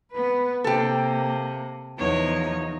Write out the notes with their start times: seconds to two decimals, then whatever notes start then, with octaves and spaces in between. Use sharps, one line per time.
0.12 B3 B4
0.64 C3 A#3 G4 A4
1.98 E2 F3 D#4 C#5